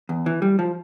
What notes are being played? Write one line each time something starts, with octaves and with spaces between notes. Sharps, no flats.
E2
E3
G3
F3